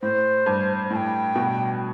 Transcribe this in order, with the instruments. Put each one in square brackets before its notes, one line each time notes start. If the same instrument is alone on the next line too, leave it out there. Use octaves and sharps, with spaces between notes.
[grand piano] A2 [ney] C5
[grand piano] G2
[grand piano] A2 [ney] A5
[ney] G5
[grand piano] B2